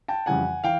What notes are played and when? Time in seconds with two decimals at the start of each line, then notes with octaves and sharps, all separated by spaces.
0.08 G5 A5
0.26 F2 C#3 E3 G3 F#5 G#5
0.64 E3 F5 G5